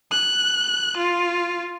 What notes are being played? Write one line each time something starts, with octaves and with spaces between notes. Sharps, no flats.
F#6
F4